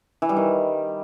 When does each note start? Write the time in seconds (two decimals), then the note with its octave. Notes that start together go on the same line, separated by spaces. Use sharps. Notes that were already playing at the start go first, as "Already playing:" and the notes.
0.22 E3
0.29 G3
0.37 D#3